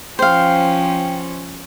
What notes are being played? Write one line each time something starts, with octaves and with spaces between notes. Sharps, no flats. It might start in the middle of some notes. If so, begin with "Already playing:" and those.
F3 C#4 C5 F5 G5